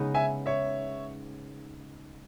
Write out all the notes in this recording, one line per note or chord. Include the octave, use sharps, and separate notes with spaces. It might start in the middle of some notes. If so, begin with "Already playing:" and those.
Already playing: C#3 G#3 B3 D#4
E5 G#5
C#5 E5